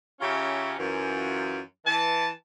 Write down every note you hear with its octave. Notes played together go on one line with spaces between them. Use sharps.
C#3 C#4 F4 G4 E5 A#5
F#2 E3 F4
E3 A5